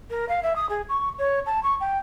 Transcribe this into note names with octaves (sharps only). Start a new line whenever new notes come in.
A#4
F5
E5
D#6
G#4
C#6
C#5
A5
C#6
G5